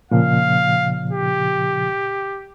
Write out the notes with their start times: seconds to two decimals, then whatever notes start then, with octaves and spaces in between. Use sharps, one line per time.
0.11 A#2 C#3 F3 F5
1.11 G4